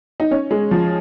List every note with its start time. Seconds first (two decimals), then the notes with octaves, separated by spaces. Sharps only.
0.20 D#4
0.31 C#4
0.51 G#3
0.71 F3